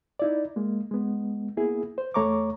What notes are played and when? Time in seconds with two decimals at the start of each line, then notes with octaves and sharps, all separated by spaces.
0.19 D#4 E4 D5
0.56 G#3 A#3
0.91 G#3 B3
1.57 A#3 B3 E4 G#4
1.98 C5
2.14 E2 A3 C#5 A#5 C#6 D6